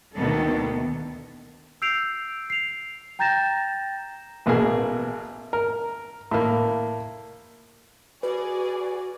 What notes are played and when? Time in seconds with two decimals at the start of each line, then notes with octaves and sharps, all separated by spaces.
0.17 D2 B2 D#3 A#3 B3 A4
1.82 E6 G6 C7 D7 F7
2.50 C7 F7
3.19 G5 A#5 G6 A6 A#6 E7
4.46 A1 B2 A#3 G#4
5.53 A#4
6.31 A2 A#3
8.23 F#4 G#4 B4 D5 G#5